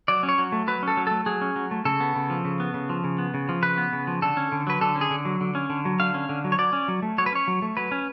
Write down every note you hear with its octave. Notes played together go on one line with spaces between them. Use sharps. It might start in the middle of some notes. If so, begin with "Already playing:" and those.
F#3 D5
C#4
C#5
F#3
A3
F#3 B4
C#4 A4
F#3
A3 A4
F#3 G#4
C#4
F#3
A3
C#3 A4
B3
C#3
F3
C#3
B3
C#3
F3
C#3
B3
C#3
F3
C#3 B4
B3
C#3
F3
D3 A4
C#4
D3
F#3 B4
D3 A4
C#4
G#4
D3
F#3
D3
C#4
D3
F#3
D3 F5
C#4
D3
F#3
C#5
F#3 D5
C#4
F#3
A3
F#3 C#5
B4
C#4 C#5
F#3
A3
F#3 B4
C#4